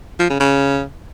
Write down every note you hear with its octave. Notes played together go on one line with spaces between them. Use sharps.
F3
C#3
C#3